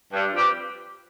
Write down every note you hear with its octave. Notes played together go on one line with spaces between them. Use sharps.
G2
F3 C4 G4 B4